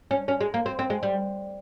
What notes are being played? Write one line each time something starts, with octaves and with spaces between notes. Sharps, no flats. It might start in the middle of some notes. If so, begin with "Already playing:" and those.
C#4
C#4
G#3
A#3
C4
C4
G#3
G3